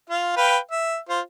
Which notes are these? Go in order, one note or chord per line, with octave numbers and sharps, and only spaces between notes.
F4 F5
B4 F5 G5
E5
F4 C5